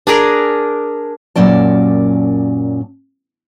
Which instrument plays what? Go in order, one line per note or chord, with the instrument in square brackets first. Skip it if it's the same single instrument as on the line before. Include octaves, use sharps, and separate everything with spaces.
[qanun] D4 G#4 A#4 D5
[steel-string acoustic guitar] F#2 A#2 F#3 C#4 D5 A5